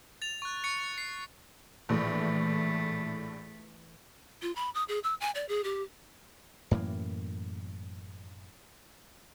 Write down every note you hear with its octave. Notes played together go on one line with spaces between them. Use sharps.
A6 F7
C#6 F#6
C#6 A6 C#7
C7
A#1 A2 E3 A3
F4
B5
D#6
G#4
E6
G#5
D5
G#4
G4
F#2 A2 E3 A#3